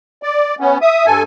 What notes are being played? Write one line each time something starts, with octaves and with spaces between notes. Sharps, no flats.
D5
B3 C#4
E5 D#6
G2 A4 G#5